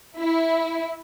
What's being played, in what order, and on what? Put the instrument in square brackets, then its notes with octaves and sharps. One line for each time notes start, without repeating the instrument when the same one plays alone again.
[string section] E4